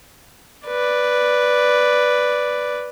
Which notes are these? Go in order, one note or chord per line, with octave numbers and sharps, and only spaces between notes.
B4 D5